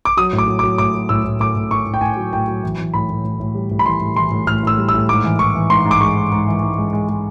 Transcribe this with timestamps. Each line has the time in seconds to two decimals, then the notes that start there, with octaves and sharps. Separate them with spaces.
0.05 D6
0.17 F#3 D#6
0.33 A2
0.38 D6
0.48 F#3
0.59 D6
0.63 F#3
0.78 A2 D6
0.95 F#3
1.09 A2 E6
1.24 A2
1.40 A2 D6
1.56 A2
1.71 A2 C#6
1.86 A2
1.94 G5
2.01 A2 G#5
2.16 F#3
2.33 A2 G5
2.48 F#3
2.63 E3
2.79 E3
2.94 A2 B5
3.10 A2
3.24 A2
3.40 A2
3.55 G3
3.71 A2
3.79 B5
3.86 E3 C6
4.01 A2
4.16 E3 C6
4.31 A2
4.47 A2 F6
4.63 A2 E6
4.77 G3
4.89 E6
4.94 A2
5.09 G#2 D6
5.24 E3
5.39 E3 C#6
5.55 E3
5.70 G#2 C6
5.85 G#2
5.91 D6
6.01 G#3 C#6
6.16 G#2
6.32 G#2
6.47 E3
6.62 G#2
6.78 G#3
6.93 G#3
7.09 G#3